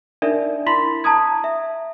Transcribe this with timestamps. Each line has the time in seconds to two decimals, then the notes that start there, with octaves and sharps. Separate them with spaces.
0.22 D4 D#4 A#4 D5 E5
0.66 E4 B5 C6 B6 F#7
1.04 A5 A#5 D#6 G#6
1.44 E5